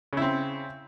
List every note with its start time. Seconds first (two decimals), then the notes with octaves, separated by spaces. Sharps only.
0.13 C#3
0.17 E4
0.22 C4